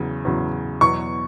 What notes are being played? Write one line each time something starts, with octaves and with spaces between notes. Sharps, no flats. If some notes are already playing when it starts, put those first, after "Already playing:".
Already playing: E2 C#3 F#3
E2 C#3 F#3
E2 B2 F#3 C#6